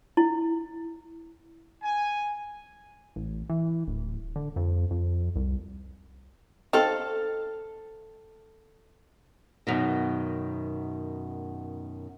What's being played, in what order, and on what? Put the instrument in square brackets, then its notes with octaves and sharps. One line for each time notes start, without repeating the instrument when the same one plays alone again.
[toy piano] E4
[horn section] G#5
[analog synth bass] A1
E3
D1
D3
F2
F2
C2
[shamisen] C4 D#4 [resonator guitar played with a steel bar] A4 F5
[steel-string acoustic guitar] F#2 B2 D#3